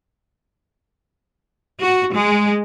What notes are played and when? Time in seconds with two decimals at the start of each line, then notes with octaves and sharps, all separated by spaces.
1.80 F#4
2.13 G#3